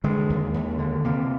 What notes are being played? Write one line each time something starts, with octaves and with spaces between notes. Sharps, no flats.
D3 G#3
D#2
D#2
D3
C3 A#3